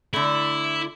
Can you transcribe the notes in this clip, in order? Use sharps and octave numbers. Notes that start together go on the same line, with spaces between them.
D3 A3 E4